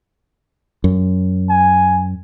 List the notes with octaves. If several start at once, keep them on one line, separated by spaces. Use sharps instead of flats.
F#2
G#5